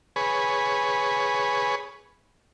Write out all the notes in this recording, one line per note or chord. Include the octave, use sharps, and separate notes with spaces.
G#4 B4 C#5